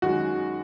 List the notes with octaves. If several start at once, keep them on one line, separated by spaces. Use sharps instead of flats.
F#2 D#3 G#3 F#4